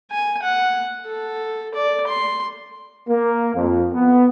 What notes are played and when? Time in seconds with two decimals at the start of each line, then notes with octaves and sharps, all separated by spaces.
0.11 G#5
0.42 F#5
1.06 A4
1.74 D5
2.07 C6
3.08 A#3
3.55 F2
3.94 B3